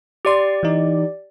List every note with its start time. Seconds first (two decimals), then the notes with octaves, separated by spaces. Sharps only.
0.25 G4 D5 C6 D6
0.63 E3 D#4